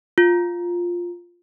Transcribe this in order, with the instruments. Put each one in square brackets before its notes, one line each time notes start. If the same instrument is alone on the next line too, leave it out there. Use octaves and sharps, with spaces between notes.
[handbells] F4